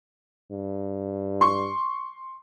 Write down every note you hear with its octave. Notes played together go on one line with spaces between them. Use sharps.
G2
C6 C#6